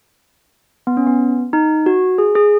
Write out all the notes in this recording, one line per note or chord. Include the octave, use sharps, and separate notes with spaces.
B3
C#4
B3
D#4
F#4
G#4
G#4